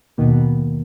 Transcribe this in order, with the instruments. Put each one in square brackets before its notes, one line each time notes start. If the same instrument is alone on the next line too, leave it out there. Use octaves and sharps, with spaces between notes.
[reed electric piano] D#2 D#3 A#3 [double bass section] B2 B3